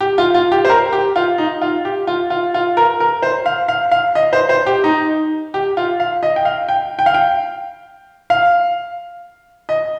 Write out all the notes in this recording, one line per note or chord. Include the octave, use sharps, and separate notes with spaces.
G4
F4
F4
G4
C5
A#4
G4
F4
D#4
F4
G4
F4
F4
F4
A#4
A#4
C5
F5
F5
F5
D#5
C5
C5
G4
D#4
G4
F4
F5
D#5
G5
F5
G5
G5
F5
G5
F5
D#5